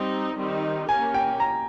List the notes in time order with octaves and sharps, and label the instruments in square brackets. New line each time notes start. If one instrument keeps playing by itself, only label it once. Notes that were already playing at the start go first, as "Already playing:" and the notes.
Already playing: [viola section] G3 C4 D#4
D#3 G3 C4 D#4
[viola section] A#3 C#4 G4 A#4 [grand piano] G#5
[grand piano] G5
A#5